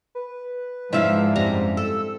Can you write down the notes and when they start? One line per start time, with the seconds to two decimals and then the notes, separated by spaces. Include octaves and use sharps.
0.15 B4
0.93 G#2 F3 D4 E4 E5 F5
1.36 F#2 G3 C4 A#5
1.77 A4 E6